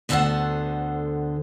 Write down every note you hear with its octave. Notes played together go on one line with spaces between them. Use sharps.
D2 D3 B3 A4 C5 F#5